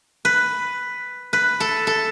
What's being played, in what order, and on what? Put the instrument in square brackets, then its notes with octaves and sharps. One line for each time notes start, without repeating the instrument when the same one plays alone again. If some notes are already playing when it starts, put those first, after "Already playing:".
[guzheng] B4
B4
A4
A4